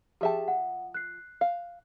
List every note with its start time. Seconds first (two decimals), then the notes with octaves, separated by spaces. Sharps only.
0.21 F3 G4 G#4 E5 G5 A5
0.48 F#5
0.94 F#6 C7
1.41 F5